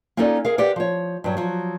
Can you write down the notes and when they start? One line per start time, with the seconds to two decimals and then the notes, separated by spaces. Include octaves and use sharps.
0.17 A#3 C#4 D#4 F4 A4 D5
0.45 G#4 A#4 F5
0.58 G4 A#4 B4 D5 F5 F#5
0.76 F3 C#5
1.24 G2 F#3
1.37 F3 F#3